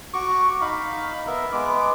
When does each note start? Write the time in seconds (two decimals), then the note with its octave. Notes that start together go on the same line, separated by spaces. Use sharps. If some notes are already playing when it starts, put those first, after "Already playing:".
0.14 F#4 C#6 D6
0.61 D#4 F5 B5
1.27 B3 A#4 E5
1.52 G#3 B3 D6